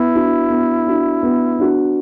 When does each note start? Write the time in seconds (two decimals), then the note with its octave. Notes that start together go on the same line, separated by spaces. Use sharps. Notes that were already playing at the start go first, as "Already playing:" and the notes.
Already playing: B3 E4
0.15 D4 F#4
0.50 B3
0.87 D4 F#4
1.23 B3
1.59 D4 F#4